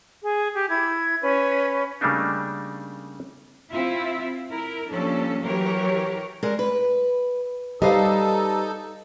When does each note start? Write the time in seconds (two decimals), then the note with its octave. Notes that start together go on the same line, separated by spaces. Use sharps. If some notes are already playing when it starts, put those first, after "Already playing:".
0.22 G#4
0.54 G4
0.69 E4 G#6
1.21 C#4 B4
2.01 C#3 G3 A3 A#3 D4 D#4
3.71 C4 E4 F4 E5
4.50 E4 A#4
4.90 F3 G3 A#3 C#4 D4 A4
5.44 E3 F#3 G4 A#4 C#5
6.43 G3 G#3 A#4
6.59 B4
7.82 G3 D#4 A4 B4 C5 D#5 F5